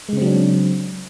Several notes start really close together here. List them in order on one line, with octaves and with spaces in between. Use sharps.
G#3 C#3 C4 F#3 D4